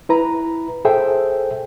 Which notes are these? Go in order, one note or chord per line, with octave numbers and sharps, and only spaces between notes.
E4 B4 A#5
G#4 A4 C5 E5 G5